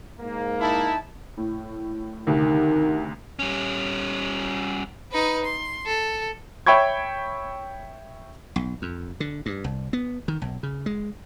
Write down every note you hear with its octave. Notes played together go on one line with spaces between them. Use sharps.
G#2 A#3
D#4 E4 A5
A2
D2 C3 D#3
G3 C#4
D#4 B4
C6
A4
C#5 E5 G5 B5 C#6 G#6
B1
F2
D3
G2
C2
B3
D#3
B1
C#3
G#3